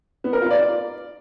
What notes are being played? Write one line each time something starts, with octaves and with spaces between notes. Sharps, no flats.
B3
A#4
F4
D5